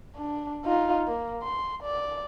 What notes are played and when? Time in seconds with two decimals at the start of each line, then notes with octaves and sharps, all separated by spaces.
0.16 D4
0.64 D#4 F4
1.08 A#3
1.43 C6
1.83 D5